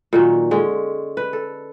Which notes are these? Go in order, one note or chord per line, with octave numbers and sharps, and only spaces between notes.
A#2 D#3 F#3
D3 G#3 C#4
B4
A4